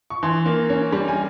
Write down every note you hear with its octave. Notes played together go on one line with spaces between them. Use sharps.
C#6
E3 C6
A#3
C#4
G3
G#5